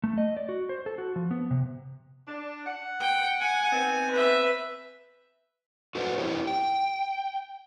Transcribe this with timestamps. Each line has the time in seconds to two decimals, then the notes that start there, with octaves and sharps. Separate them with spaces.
0.04 A3
0.18 D#5
0.37 D5
0.49 F#4
0.69 C5
0.86 A4
0.98 F#4
1.16 F3
1.31 B3
1.51 C3
2.28 D4
2.66 F#5
3.00 G5
3.40 G#5
3.72 D#3 B3 C4
4.11 B4 E5
5.95 F#4 A4 B4 C5 D5 F#5
6.18 E4 G4 A#4 C#5
6.47 G5